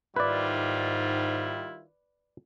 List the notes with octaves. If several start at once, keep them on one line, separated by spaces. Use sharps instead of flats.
G#2 D#3 G3 E4 F4 B4 D5